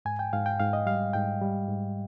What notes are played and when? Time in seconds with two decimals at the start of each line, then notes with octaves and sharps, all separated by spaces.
0.05 G#2 G#5
0.19 G5
0.33 G#2 F5
0.46 G5
0.60 G#2 F5
0.73 D#5
0.86 G3 F5
1.14 G#2 G5
1.41 G3
1.68 G#2